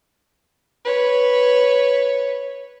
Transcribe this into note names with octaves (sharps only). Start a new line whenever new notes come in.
B4 C#5